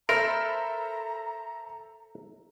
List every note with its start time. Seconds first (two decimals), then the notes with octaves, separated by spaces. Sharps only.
0.09 A4 A#4 C5 E5 A#5 B5 F6